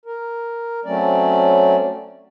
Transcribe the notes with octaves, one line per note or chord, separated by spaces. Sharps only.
A#4
F#3 A3 C4 C#4 D5